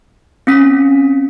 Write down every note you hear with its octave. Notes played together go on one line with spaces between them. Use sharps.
C4 C#4 B6